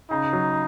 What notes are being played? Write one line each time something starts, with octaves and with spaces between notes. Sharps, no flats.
C#3 D#4
F#3